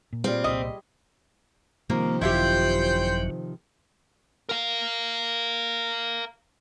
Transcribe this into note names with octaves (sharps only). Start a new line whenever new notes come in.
A#2
G3 C4 F4 G#4
C2 A#2 D#5 E5 C6
C3 D#3 F3 A#3
G#1 F#2 F#3 E4 F4 G4 C5 G5
A#4 F5